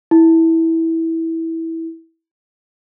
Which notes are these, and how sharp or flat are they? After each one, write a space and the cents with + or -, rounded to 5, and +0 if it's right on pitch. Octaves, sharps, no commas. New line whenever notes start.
E4 -15